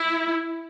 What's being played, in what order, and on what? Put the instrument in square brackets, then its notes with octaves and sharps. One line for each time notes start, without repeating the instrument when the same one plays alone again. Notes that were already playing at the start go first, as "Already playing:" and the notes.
Already playing: [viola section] E4